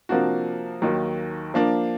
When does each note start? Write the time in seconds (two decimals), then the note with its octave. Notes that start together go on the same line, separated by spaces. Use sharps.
0.09 C3 F3 A#3 D4 F#4
0.82 D#2 D#3 F#3 A#3 D#4
1.54 F3 A#3 D4